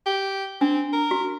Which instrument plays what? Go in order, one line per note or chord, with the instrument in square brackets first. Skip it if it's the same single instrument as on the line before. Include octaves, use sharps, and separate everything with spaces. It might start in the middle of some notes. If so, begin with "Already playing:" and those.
[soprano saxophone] G4
[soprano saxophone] C4 [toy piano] D4
[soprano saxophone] A#4
[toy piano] F#4